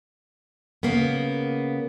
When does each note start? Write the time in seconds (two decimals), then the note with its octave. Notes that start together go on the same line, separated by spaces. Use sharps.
0.83 C#3 A#3 B3